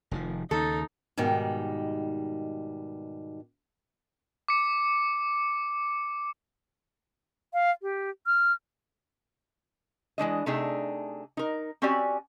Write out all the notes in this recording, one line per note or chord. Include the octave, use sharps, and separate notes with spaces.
F1 D#3 F3
D#2 C#3 D#4 A4
G#2 B2 D#3 G3
D6 C#7
F5
G4
F6
E3 G#3 D4 D#5
C3 A3 D4 D#4 G#4
D#4 A#4
C4 C#4 F#4 G4 D5 G#5